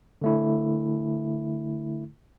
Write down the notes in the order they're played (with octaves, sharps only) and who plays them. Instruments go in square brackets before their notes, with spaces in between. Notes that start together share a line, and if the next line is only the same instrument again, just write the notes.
[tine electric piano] D3 A3 E4